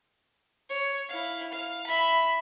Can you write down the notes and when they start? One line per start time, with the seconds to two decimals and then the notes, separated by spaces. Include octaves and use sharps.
0.69 C#5
1.09 E4 F5
1.52 F5
1.87 E5 B5